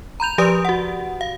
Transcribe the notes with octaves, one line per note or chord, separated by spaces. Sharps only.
A#5 B5 G6 F7
F3 G4 B4 D5 D#6 D7
F#4 F#5
F5